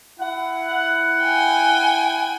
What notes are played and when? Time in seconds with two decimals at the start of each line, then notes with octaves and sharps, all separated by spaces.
0.20 E4 F#5
1.23 G5 G#5